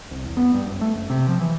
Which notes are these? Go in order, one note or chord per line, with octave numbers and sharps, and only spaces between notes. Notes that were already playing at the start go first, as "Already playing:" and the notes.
C2
E2
B3
G2
F#1
A3
F#1
C3
F3
E3